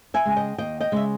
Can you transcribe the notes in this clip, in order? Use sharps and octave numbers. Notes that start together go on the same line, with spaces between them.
E5 G#5
C#3 G#3
D#5 G5
D#2 D#5 G5
D#5 G5
C#3 G#3 E5